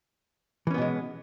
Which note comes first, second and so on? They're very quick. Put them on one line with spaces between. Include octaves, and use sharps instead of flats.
E3 C#4 B3 B2 G#3